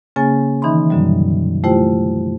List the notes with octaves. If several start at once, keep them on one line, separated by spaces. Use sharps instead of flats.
C#3 A#3 C#4 G#4 G#5 A6
D#3 E3 D#4 E5 B5 C6
F#2 B2 D3 F#3 G3
A3 E4 F4 G4 C5 G5